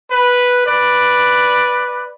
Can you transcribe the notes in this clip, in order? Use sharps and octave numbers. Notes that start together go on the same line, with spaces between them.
B4
B4 D5